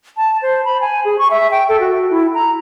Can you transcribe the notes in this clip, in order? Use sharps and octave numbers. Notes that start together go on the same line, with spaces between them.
A5
C5
B5
G#5
G#4
C#6
E5
G5
A4
F#4
E4
A#5